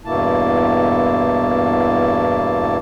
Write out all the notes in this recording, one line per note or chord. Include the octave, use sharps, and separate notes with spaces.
E2 G2 B2 A#3 E4 A5